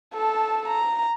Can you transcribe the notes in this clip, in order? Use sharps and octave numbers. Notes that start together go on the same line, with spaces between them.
A4 A5
A#5